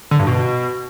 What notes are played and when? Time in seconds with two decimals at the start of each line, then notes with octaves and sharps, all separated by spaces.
0.11 D3
0.19 G2
0.27 B2